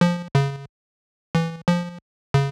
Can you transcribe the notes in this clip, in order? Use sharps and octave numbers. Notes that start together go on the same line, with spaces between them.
F3
C#3
E3
F3
C#3